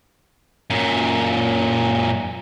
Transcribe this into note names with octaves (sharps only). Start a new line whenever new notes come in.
F#2 A#2